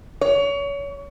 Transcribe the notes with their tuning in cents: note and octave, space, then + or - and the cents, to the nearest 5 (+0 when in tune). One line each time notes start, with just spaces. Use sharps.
C#5 +30